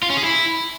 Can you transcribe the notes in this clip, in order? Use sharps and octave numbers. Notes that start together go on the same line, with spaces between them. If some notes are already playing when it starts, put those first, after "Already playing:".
F4
C#4
G#4
E4